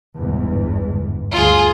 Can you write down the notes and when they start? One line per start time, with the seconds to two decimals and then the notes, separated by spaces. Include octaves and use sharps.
0.20 G1 E2 G#2
1.31 D2 G2 F4 G#4